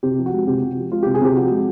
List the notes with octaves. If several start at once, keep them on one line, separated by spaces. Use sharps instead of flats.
C3 G4
F3
F#4
G#3
C3 G4
C3
F3
G#3 F4
C3 G4
G#4
C3 G4
F3 F#4
G#3